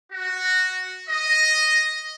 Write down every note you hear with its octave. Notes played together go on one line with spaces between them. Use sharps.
F#4
D#5